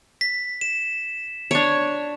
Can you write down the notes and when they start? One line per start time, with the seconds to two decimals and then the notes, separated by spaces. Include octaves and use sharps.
0.21 B6
0.61 E7
1.51 D4 C#5